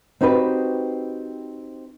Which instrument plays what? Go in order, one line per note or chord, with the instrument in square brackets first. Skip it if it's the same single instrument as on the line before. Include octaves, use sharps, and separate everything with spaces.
[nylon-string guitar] C4 D#4 F#4 G4 B4